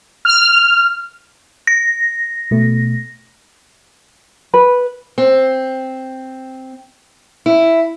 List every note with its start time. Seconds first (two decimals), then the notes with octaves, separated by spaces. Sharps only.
0.25 F6
1.67 A#6
2.51 B2 A3
4.54 B4
5.18 C4
7.46 E4